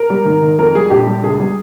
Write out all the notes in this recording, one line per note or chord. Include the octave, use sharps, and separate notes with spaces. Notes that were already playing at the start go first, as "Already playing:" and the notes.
Already playing: A#4
G3
G#1
D#3
F2 A#4
G3 G#4
A#1 G4
G3
C#2 G#4
G3